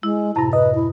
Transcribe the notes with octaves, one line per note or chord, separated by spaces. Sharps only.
G#3 E4
F#2 A2 C3 E4 A5 A#5
B4 D#5
E4